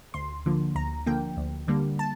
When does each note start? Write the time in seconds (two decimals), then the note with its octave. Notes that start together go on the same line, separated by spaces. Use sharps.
0.14 D2 C6
0.46 D3 F3 A#3
0.75 D2 A#5
1.06 D3 F3 A#3 G5
1.37 D2
1.68 D3 G3 A#3
1.99 A5